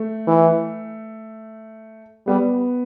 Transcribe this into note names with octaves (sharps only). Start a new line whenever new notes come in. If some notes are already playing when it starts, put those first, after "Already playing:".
Already playing: A3
E3
G3 B3